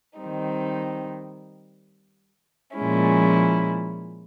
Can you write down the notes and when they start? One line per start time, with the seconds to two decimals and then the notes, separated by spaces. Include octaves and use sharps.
0.20 D#3 G3 C4 D#4
2.76 A#2 F3 G#3 C#4 E4